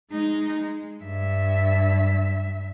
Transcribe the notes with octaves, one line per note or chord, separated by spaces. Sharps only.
G#3 D#4
G#3
G2 E5